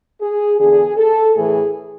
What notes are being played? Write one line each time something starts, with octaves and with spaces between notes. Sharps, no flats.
G#4
E2 D3 G#4
A4
A2 E3 G#4